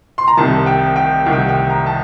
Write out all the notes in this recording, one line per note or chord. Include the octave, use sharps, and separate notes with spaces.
C6
A#5
C2 C3 D#3 A5
G5
G5
C2 C3 D#3 F#5
G5
F#5
G5
A#5
A5